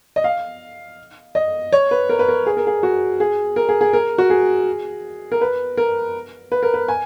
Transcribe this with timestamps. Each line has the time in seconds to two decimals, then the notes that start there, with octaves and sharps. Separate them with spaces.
0.16 D#5
0.24 F5
1.35 D#5
1.72 C#5
1.91 B4
2.09 A#4
2.19 B4
2.28 A#4
2.46 G#4
2.57 A#4
2.67 G#4
2.83 F#4
3.20 G#4
3.56 A#4
3.69 G#4
3.81 G#4
3.93 A#4
4.18 F#4
4.30 G#4
5.32 A#4
5.41 B4
5.78 A#4
6.52 B4
6.63 A#4
6.74 B4
6.88 G#5